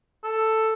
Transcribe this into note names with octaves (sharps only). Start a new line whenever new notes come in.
A4